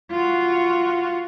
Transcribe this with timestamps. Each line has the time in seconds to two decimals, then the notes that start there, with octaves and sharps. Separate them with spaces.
0.11 F4 F#4